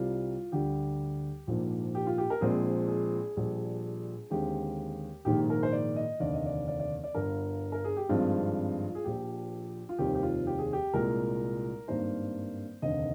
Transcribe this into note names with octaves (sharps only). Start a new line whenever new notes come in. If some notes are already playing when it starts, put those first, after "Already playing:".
Already playing: C2 C3 G3 C4 F4
D2 D3 G3 G4
A#1 G#2 F3 A#3
G4
F4
G4
A#4
A#1 A#2 G#3 C4 G#4
G#4
A#1 A#2 G3
D#2 D3 G#3 C4 G4
A#1 G#2 D#3 A#3 G4
A#4
C5
D5
D#5
F1 D#2 D3 D5
D#5
D5
D5
D5
D5
G1 G2 D3 A#4
A#4
G#4
G4
G#1 G2 F3 G#3 C4 F4
G#4
A#1 A#2 F3 G4
F4
F1 D#2 D#3 G3 C4 G4
G4
F4
G4
G#4
G4
C2 A#2 G#3 A#4
G#1 G2 D#3 A#3 C5
F1 D#2 D3 D#5